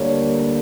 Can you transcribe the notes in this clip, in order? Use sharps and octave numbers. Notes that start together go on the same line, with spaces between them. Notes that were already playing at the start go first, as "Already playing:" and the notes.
Already playing: D2 D3 G3 A#3 C#5